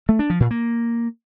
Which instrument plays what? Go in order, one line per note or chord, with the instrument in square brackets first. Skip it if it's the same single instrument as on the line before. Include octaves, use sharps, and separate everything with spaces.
[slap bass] A3
D4
F3
A#2
A#3